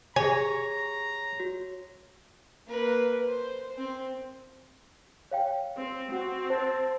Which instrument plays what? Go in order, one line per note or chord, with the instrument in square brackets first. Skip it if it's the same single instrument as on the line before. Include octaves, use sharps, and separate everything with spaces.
[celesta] G4 G#4 [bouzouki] C#5 [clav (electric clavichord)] G#5 [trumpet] A#5
[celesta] F#4
[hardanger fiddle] A#3 B4
C5
C4
[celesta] C#5 F5 G5
[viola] C4
[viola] C4 [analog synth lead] F#4
[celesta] C5 [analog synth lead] A5